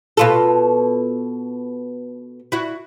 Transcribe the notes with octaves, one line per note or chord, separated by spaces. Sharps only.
B2 F4 A4
E4 F#4